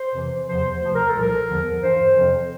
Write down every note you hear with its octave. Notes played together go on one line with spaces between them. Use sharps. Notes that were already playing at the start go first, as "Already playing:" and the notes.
Already playing: C5
F2 C3 E3
E2 C3 F3 C5
D2 C3 F3 C5
A#4
A4
C2 A#2 F3
A#4
E2 D3 F3
G2 E3 C5
F2 C3 F3